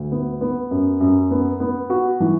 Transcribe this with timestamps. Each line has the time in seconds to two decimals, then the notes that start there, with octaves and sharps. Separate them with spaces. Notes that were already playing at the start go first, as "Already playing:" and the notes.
Already playing: D2
0.12 B3
0.41 B3
0.71 F#2
1.00 F#2
1.31 B3
1.60 B3
1.90 F#4
2.20 E3